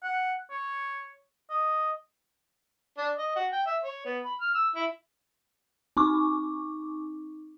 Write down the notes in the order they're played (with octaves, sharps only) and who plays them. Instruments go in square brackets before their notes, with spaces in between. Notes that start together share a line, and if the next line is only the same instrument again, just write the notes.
[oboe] F#5
C#5
D#5
[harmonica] D4
D#5
F#4
G5
E5
C#5
B3
B5
F6
E6
E4
[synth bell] C4 D#4 C#6 D6